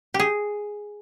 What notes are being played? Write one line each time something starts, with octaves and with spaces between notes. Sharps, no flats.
G4
G#4